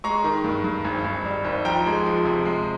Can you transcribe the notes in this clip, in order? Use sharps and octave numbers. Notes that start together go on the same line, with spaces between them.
G#3 A#5 C#6
D#3
G2
G2
G#1
G#1
G3
G#1
F3 G5 A#5
G#3
F3
C3
G#3